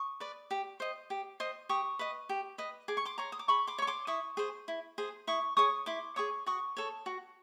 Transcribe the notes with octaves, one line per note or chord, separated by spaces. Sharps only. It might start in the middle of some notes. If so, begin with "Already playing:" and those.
Already playing: C#6 D#6
B4 D5
G4
C5 D#5
G4
C5 D#5
G4 C#6 D#6
B4 D#5
G4
B4 D#5
G#4 D6
C#6
C6 D6
C#5 A#5 C6
D#6
D6
G#4 B5 C#6
C6 D6
C#5 C#6
C6 D6
E4 C#6 D#6
G#4 C5
E4
G#4 C5
E4 C#6 D#6
G#4 C#5 C#6 D#6
E4 C6 D6
G#4 C#5 C#6 D#6
F#4 C#6 D#6
A4 C#5
F#4